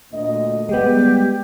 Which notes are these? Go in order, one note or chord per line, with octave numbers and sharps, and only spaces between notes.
D2 A#2 D#5
G3 G#3 B3 G4